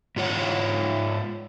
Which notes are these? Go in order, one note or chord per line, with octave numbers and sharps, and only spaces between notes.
G#2 F4 C#5 F#5